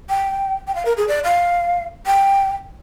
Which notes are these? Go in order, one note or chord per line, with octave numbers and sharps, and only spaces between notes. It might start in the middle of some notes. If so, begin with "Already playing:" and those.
G5
G5
F5
A#4
G#4
D5
F5
G5